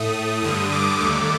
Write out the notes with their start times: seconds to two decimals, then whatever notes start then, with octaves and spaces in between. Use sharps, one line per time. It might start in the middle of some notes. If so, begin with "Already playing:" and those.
Already playing: A2 A3 D#6
0.42 G2 D3 G3 D#6
0.72 D6
1.00 D#2 D3 A3